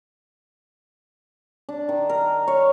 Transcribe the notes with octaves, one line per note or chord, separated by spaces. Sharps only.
D4
D#3
A#4
C#5